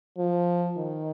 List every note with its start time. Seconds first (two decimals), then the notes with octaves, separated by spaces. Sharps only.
0.18 F3
0.77 D#3